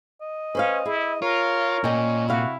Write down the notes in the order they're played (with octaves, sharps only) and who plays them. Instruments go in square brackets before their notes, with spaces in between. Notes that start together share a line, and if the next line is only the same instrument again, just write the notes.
[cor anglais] D#5
[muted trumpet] C#4 [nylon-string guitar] B4 C5 F5
[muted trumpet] E4 [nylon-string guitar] G#4
[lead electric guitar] F4 [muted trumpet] A#4 [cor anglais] C#5
[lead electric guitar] A#2 [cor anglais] C#4 [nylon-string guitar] D#5 G5
[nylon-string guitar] C3 F5 [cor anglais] E4 [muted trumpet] F#4